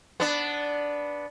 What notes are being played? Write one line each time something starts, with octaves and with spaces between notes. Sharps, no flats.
B3 D4